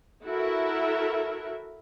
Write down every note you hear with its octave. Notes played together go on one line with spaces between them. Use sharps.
E4 F#4 A4 A#4 E5